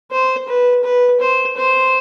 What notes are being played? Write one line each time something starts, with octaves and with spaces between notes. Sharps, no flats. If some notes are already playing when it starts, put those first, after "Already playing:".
C5
B4
B4
C5
C5